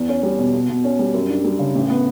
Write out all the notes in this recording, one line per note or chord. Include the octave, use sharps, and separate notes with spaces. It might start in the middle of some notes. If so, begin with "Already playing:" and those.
Already playing: E2
C#4
G3
B2
B2
B2
C#4
G3
F#2
D4
G3
C#3
A1
B3